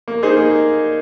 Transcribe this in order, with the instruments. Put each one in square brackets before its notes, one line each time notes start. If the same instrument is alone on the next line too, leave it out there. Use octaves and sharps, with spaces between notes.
[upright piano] A#3
D#4 G#4 C5
A#3